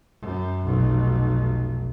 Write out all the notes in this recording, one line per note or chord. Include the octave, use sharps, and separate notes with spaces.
F#2
F1 B1